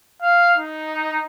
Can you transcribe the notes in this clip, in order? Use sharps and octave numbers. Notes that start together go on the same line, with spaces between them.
F5
D#4